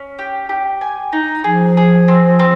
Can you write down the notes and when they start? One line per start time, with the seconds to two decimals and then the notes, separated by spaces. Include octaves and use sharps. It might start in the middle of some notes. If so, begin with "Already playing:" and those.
Already playing: C#4
0.19 G4
0.49 G4
0.81 G#5
1.13 D#4
1.44 F3 G#4
1.77 G#4
2.08 C4
2.39 C4